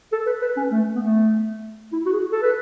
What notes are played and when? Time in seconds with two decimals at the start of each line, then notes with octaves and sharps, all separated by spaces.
0.12 A4
0.26 B4
0.42 B4
0.57 C#4
0.71 A3
0.95 B3
1.03 A3
1.92 E4
2.06 F#4
2.12 G#4
2.32 A4
2.42 B4